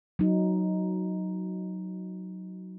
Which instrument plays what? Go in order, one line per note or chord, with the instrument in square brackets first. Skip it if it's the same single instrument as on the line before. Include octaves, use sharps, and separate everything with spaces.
[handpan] F#3 D#4